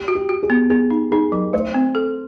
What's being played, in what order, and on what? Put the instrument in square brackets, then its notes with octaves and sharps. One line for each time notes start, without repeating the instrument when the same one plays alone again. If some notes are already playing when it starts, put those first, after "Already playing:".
Already playing: [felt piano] G4
[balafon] F#4
[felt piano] G4
[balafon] F#4
[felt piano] G#4
[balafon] B3
[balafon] B3 [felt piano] G#4
[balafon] D#4
[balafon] D#4 [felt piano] G#4
[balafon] F#3 [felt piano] A#4
[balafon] A3 [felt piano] C5
[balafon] C4
A4